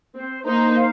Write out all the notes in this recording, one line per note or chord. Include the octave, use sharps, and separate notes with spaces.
C4 C5
A#3 D#4 C5
F5